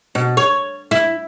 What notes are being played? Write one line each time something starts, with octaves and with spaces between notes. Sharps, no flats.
B2
C#5
E4